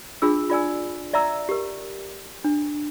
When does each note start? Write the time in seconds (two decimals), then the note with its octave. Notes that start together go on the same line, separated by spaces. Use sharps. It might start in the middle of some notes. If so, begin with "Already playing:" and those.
0.22 D4 F4 G#4 E6
0.50 F4 D5 G#5 E6
1.13 D5 E5 A#5 E6
1.49 G4 A#4
2.44 D4